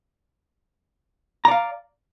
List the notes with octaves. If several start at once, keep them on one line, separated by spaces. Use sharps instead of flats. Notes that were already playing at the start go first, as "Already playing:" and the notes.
D5 F5 A#5